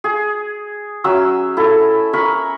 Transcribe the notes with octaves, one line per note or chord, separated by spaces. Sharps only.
G#4
F#3 C#4 E5 E6
E4 A4
A#4 B5 C#6